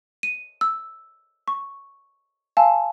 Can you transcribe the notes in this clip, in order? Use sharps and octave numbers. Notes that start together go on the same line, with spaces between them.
D#7
E6
C#6
F5 G#5 A5 C6 E6